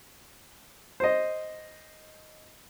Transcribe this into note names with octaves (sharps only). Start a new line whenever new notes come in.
C5 D#5